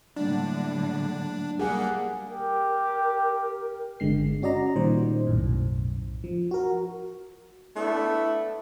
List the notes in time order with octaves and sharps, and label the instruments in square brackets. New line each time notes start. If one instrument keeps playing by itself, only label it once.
[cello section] A2 D3 G3 [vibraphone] F#3 A3 A#3 [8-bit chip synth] D4
[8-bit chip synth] G3 A#3 [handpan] G#4 F#5
[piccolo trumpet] G4 [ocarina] A#4
[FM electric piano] G1 D3 G#3 C7
C#4 F#4 D5 D#5 A#5
A#2 D#3 G3 C5
B1 F#2 A2
F3
F#4 A#4
[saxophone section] A3 B3 D4 E4